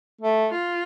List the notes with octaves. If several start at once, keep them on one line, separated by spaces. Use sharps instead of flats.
A3
F4